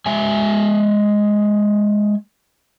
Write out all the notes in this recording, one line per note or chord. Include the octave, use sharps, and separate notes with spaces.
G#3 E5 G#5